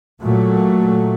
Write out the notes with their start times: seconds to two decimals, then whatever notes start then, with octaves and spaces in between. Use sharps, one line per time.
0.21 A#2 F#3 A3